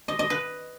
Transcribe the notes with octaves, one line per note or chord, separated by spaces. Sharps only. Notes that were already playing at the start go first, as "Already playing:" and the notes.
D#5
D#5
B4